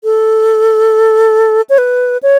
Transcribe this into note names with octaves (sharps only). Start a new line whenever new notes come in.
A4
C#5
B4
C#5